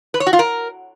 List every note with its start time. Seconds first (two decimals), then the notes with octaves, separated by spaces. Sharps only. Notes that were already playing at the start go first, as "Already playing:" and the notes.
0.14 B4
0.20 C#5
0.27 F#4
0.33 F4
0.39 A#4